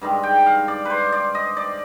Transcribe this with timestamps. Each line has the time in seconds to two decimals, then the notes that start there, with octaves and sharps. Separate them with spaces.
0.01 G2 D#3 G#3
0.23 G5
0.46 F5
0.68 D5
0.85 B4 C5
1.12 D5
1.35 D#5
1.57 D5